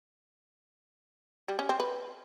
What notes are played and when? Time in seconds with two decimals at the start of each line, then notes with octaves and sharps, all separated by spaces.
1.48 G3
1.59 C#4
1.69 C4
1.80 B4